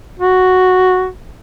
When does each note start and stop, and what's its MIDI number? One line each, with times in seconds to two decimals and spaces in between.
0.20 1.08 66